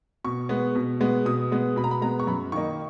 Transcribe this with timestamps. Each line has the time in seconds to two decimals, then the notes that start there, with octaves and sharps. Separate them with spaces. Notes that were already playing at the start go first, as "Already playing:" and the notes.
0.24 B2 C#6
0.49 G#3 B3
0.75 B2
1.01 G#3 B3
1.26 B2 D#6
1.52 G#3 B3
1.76 B2 B5
1.84 A#5
1.91 B5
2.02 G#3 B3 A#5
2.20 C#6
2.27 F#2 B5
2.52 D#3 A#3 D#4 C#6